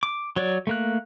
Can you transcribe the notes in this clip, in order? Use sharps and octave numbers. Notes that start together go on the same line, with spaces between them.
D6
F#3 C#5 D5
A3 A#3 F#6